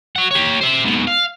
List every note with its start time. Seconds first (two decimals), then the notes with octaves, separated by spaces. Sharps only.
0.16 C#5 F#5
0.31 G4 C#5
0.61 C5 E5
0.85 G#2 B2
1.07 F5